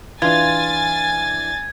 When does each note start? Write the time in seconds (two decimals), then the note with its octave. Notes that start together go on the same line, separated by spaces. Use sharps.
0.22 E3 D4 F4 G#5 G#6 A6